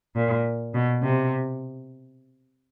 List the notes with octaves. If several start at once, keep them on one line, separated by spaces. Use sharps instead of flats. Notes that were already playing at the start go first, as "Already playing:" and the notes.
A#2
B2
C3